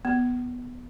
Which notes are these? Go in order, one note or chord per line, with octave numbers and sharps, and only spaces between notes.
B3